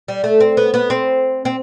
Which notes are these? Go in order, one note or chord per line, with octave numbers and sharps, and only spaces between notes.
G3
A3
C4
B3
B3
C4
C4